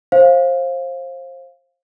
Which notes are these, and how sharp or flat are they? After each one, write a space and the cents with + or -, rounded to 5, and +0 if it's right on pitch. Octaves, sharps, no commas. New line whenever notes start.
C5 +25 F5 +0